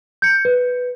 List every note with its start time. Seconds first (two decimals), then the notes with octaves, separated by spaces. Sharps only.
0.22 G6 C#7
0.45 B4